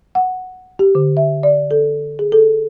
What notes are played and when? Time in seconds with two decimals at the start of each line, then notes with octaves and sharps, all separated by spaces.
0.15 F#5
0.79 G4
0.95 D3
1.17 E5
1.43 D5
1.71 A4
2.19 G#4
2.32 A4